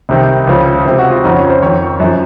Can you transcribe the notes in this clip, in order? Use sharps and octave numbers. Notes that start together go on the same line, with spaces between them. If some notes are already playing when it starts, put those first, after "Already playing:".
C2 C3 D#3
C#2 C#3 F3
C#2 C3 F3 C5
F#4
F4
F2 C#3 F3 D#4
C#4
C5
F2 D#3 C#5
F#2 F3